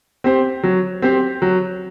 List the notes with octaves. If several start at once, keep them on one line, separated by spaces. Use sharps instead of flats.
C4 G4 C5
F#3
C4 G4 C5
F#3